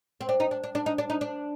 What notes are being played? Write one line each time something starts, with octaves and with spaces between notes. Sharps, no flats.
C4
D4
D#4
D4
D4
D4
D#4
D4
D#4
D4